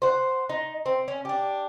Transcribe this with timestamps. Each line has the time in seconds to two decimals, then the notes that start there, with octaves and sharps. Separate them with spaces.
0.02 C5 F#5
0.50 D#4
0.86 C4
1.08 C#4
1.25 D4 G4